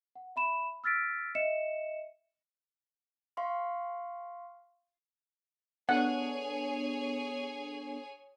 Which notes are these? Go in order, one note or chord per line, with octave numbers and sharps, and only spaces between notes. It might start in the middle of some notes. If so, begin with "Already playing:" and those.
F#5
E5 B5 E7
E6 F6 A6 B6 D7
D#5 E5 C#7 E7
F5 C6 C#6
B3 D4 G#4 A4 C#5 F#5 G#5